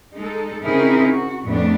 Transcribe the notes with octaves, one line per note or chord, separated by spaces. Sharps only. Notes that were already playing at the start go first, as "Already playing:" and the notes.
G#3 D#4 A4
C#3 C4 D#4 E4 G#4 A#4
F#4
F2 A2 C#3 A3 B3 D4